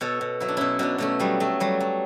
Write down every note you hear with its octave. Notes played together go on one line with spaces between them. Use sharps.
B2 A4 C#5
B2
F#3 E4
D4
B2 C#4 E4
B2 B3 D4
B2 A3 C#4
F#3 G3 B3
F#3 A3
F#3 G3
F#3